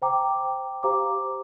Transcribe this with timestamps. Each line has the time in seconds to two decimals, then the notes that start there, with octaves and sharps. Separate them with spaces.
0.02 C5 G5 A#5 D6
0.83 G4 C5 F5 A#5 D6